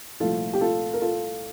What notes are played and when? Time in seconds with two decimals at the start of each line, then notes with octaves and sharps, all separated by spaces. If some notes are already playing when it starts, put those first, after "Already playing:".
0.20 C2 A#2 F3 A3 F4 A4
0.53 G4
0.61 F4 A4
0.94 A#4
1.01 F4 A4